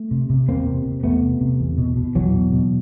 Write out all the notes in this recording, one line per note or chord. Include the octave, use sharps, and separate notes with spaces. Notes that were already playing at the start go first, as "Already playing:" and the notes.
Already playing: A3
C3
C3
E2 A#3 C4
C3
C3
E2 A3 B3
C3
C3
E2
B2
B2
E2 E3 F#3
B2
B2